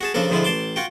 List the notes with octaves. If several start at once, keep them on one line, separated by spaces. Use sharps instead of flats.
F#4 G#4 A5
C#3 F3 D4 A4 A#4
G#2 D3 F3 G#3 E4 F4
A1 A5 C6 D6
F4 F#4 G5